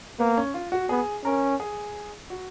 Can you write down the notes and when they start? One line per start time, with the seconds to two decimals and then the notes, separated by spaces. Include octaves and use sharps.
0.19 A#3 B3
0.37 C#4
0.54 F4
0.72 F#4
0.89 B3 G#4
1.24 C#4 A#4
1.60 G#4
2.30 F#4